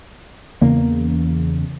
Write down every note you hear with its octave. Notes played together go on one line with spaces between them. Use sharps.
E2 C#3 A#3